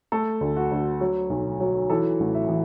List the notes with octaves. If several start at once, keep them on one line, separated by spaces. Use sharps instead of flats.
A3 A4
D2
F#4
D2
F#3
B1
F#3
E3 A4
A1
E5
E3